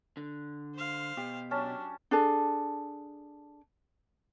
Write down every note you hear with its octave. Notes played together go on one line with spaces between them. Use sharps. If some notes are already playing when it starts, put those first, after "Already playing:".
D3
C5 F5
B2 G4
F#3 C#4 D4 A5
D4 G#4 A4